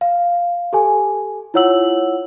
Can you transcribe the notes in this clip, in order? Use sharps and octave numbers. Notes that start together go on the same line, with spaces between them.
F5
G4 A4 G#5
E4 F4 C#5 F#5 E6 F#7